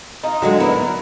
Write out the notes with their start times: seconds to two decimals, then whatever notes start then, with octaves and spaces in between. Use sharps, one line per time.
0.24 D#4 F4
0.42 D3 F#3 G#3 F#4
0.60 B3 D#4 E4 A#4